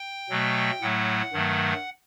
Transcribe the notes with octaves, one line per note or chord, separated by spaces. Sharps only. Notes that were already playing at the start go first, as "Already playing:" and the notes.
Already playing: G5
B2 F#3 A3
A2 F#3 A3 F#5
G2 D#3 F#3 A3